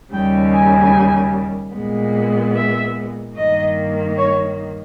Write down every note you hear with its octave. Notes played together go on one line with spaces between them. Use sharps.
D#2 C#3 G3 G5
G#5
A#2 G#3 B3
E5
G2 D#3 A#3 D#5
C#5